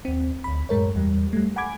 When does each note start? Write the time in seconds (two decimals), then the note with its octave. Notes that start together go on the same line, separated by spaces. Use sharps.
0.05 D#2 C4
0.44 D2 B5
0.69 F#2 A2 G#3 A#4 C#5
0.96 E2 G3
1.33 G3 A3
1.56 F#5 G#5 B5 D6 G#6